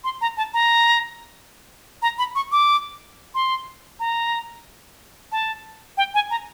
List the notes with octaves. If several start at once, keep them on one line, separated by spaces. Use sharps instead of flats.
C6
A#5
A5
A#5
A#5
B5
C#6
D6
C6
A#5
A5
G5
G#5
A#5